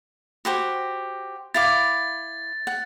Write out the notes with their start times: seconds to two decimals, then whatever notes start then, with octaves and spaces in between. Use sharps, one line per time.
0.45 F#4 G4 C5
1.54 E4 F5 D6 A6
2.67 F#5